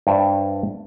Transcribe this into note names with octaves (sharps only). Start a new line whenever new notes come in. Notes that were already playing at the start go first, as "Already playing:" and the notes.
G2 C5 D5 E5